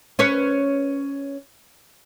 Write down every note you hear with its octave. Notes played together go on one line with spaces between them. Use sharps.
C#4 B4 C#5